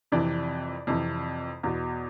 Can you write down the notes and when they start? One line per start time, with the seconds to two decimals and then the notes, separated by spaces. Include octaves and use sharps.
0.12 F2 C3 E3 D5
0.87 F2 C3 E3
1.63 E2 B2